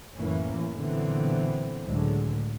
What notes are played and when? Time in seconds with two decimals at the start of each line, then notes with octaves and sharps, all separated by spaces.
0.17 F#2 A2 E3 A#3 C#4
0.75 A#2 D3 E3 F#3 B3 C4
1.85 C#2 A2 D3 F#3 G#3